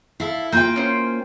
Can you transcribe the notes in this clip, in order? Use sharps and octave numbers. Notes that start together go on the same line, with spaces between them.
E4 A4 F5
A#3 F4 G5 G6
C#4 C5